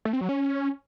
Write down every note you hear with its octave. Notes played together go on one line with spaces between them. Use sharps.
A3
C4
F#3
C#4